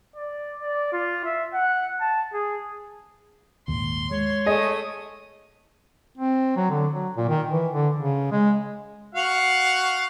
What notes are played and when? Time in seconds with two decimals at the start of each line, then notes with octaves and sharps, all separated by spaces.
0.16 D5
0.62 D5
0.93 F4
1.25 E5
1.54 F#5
2.00 A5
2.33 G#4
3.68 D#1 G#1 D#2 C6
4.11 G#3 C#5
4.46 A3 G#4 D#5 D#6
6.17 C4
6.57 F#3
6.70 D3
6.92 F#3
7.17 A#2
7.28 D#3
7.50 E3
7.72 D3
7.97 C#3
8.32 G#3
9.15 F#4 F5 F#5